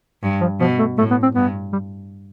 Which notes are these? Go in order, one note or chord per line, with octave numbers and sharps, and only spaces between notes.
G2
F3
B2 F3
A3
A2 A3
B3
C4
G2 B3
G3